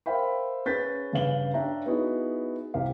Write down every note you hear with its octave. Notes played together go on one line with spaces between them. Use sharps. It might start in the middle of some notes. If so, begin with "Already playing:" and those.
A#4 C5 E5 F5 G5 B5
C#4 G#4 B4 G6 A6 B6
G2 C#3 B4 F5 F#7 G7
D4 C#5 E5 G5 A#5
B3 D#4 E4 F#4 G#4
C2 C3 G4 F5